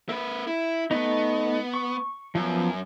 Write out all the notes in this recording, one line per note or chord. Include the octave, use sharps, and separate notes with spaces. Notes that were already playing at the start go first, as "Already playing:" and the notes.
A#3 B4 E5
E4
A3 B3 D#4
C#6
F#2 F3 B3